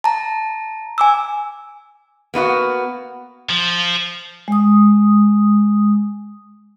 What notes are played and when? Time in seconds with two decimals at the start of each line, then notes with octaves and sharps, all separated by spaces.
0.04 A5 A#5
0.98 G#5 D6 E6
2.34 A#3 B3 F4 F#4
3.49 F3
4.48 G#3 D#6